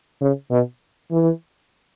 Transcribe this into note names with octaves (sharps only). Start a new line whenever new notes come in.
C#3
B2
E3